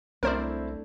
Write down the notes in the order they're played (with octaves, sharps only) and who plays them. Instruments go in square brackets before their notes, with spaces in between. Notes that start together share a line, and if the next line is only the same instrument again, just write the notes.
[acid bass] C2 [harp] A3 D4 [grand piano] C4 E4 [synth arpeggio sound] A#4 C5 D5